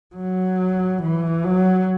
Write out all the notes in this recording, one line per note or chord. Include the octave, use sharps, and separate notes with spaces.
F#3
E3
F#3